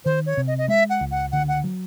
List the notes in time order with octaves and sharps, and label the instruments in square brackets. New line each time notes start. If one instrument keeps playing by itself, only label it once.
[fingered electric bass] D#3 [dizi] C5
[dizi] C#5
[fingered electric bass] C3
[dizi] D#5
D#5
[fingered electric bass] G#3 [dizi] E5
[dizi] F#5
[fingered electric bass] C#2
[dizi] F#5
[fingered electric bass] D3 [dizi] F#5
[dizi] F#5
[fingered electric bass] F#3